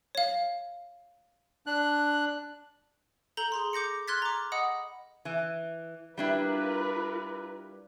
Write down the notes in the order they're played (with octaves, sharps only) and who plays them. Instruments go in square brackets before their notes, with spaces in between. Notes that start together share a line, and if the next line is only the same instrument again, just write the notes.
[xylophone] C#5 F5
[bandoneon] D4 F#6
[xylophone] A4 A#5 G6 G7
G#4 A#5 C6
D6 G6 A#6 C#7
C6 F6 F#6 G#6 A6 B6
A#5 D6
D#5 F#5 B5 D#6
[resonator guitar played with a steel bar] E3
[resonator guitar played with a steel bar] G3 D4 E4 [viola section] F4 A#4 B4